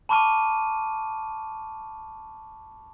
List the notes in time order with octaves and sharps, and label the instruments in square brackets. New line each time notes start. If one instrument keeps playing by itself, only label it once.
[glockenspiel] A5 B5 C#6 D6 F6 D#7